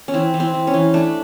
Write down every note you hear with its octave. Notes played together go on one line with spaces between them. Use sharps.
C#4
E3 C4
E3
C4
E3
C#4
E3
A3 D4